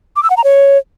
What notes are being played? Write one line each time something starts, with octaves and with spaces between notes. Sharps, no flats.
D6
E6
F#5
A#5
C#5